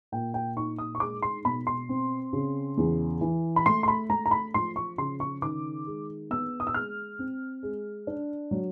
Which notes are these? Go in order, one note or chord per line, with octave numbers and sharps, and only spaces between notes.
A#2 G5
G5
D#4 C#6
D#6
C#6
G#3 D6
C6
B2 B5
C6
C4
C#3
E2
E3
B5
A3 C6
C6
B5
A3 A#5
A#5
B5
F3 C6
C#6
C#3 C6
C#6
D#3 D6
G#3
B3 E6
D#6
E6
G#3 F6
C4
G#3
D4
F#3